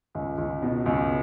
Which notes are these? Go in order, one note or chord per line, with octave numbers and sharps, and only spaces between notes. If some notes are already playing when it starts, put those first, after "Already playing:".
C#2
C#2
B2
C#2